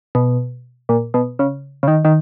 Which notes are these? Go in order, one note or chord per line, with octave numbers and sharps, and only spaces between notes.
B2
A#2
B2
C#3
C#3
D#3
D#3